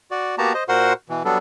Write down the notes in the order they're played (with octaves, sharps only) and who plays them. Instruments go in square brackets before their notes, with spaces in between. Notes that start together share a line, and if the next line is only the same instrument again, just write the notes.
[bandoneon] F#4 D5
A#3 B3 F#4 G4 A5 A#5
C5 D#5
A#2 F#4 A#4 C5 F#5 C6
B2 E3
F#3 G3 B3 D4 A4